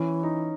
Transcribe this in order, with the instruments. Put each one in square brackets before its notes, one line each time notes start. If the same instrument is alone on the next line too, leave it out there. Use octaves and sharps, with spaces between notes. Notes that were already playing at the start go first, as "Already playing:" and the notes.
Already playing: [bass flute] E3 [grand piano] C#4
[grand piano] D#4